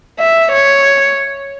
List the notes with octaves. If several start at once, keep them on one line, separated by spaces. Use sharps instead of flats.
E5
C#5